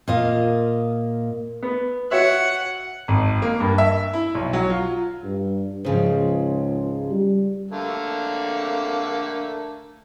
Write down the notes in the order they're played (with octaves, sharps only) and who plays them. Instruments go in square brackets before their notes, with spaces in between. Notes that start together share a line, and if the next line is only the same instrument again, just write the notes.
[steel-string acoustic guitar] A#2 A#4 D#5 F5
[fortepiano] B3
[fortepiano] F#4 C#5 E5 [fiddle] F#5
[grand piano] G#1
A#3
G2
E5
E4
B1
F#3
F4
[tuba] G2
[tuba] C#2 [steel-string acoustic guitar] G#2 C#3 F3
[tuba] G3
[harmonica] D3 A3 A#3